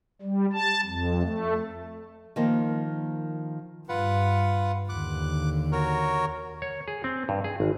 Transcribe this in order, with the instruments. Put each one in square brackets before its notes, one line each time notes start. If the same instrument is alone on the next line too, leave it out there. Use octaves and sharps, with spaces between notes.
[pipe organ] G3
A5
F2
A3
[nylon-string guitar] D#3 F3 A#3
[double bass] G2 [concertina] F4 B4 F#5
[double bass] D#2 D3 [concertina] D6 F#6
[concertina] F#4 A#4 C#5
[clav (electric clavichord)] C#5
G#4
C4
G2
G#4
G#1